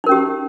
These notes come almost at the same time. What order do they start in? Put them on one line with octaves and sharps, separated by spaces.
D#4 A#4 C#4 G4